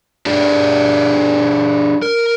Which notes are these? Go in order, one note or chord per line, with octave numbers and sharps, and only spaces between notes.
D4 G4 G#4 D5
A#4